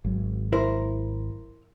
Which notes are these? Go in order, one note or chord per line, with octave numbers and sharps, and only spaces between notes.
G#1 F#3
E4 A#4 C5